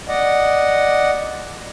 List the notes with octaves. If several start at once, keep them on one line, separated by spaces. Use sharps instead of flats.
D5 D#5 F#5